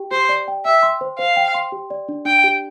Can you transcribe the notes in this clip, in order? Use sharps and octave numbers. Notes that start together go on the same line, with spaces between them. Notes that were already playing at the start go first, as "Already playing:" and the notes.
Already playing: G4 G5
G4 C5
D5
G5
E5 G5
C6
C5
C5 F5
G5
C6
G4
D5
D4
D4 G5
G4